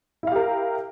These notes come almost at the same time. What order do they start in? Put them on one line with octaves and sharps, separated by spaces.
E4 F5 G4 A#4